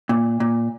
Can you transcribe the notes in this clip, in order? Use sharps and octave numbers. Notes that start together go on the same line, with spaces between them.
A#2
A#2